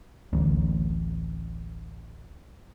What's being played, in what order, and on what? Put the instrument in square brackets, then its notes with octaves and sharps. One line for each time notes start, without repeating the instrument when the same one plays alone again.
[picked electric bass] D1 A1